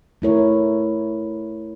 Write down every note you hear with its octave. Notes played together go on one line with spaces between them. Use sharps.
A3 E4 A#4 C#5